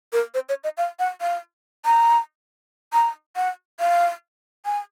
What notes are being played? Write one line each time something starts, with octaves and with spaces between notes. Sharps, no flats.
A#4
C5
C#5
D#5
F5
F#5
F5
A#5
A#5
F#5
F5
G#5